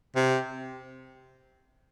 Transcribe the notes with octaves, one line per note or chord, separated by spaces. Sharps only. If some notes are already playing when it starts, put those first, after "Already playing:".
C3